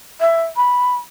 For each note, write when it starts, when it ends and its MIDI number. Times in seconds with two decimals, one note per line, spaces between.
0.20 0.43 76
0.56 0.96 83